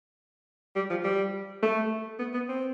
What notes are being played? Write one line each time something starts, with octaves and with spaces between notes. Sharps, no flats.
G3
F3
G3
A3
B3
B3
C4